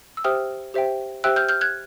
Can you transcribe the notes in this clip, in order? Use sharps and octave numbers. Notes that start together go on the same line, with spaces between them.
E6
G4 C5 E5 G5 D#6 F6
G4 C5 E5 G5
G4 C5 E5 G5 E6 F#6
F6 G6
F6 G6
F#6 G#6